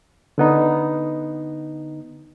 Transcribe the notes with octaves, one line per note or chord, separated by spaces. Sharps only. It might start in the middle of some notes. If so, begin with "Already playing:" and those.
D3 B3 D#4